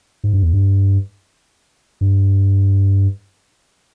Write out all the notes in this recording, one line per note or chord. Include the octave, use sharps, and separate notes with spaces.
G#2
G2
E2
G2
G2